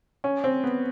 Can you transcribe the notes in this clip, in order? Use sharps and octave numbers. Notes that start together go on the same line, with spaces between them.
C#4
C4
B3